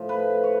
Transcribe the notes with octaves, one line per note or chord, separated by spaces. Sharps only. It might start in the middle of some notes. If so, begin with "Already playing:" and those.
Already playing: A2 F3
B4
C#5